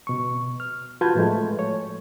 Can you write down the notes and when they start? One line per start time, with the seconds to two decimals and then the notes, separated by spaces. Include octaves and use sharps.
0.07 B2 C#6
0.60 F6
1.01 F4 F#4 B4 A5 G6 G#6
1.15 A2 F3 G#3 A3
1.59 C#5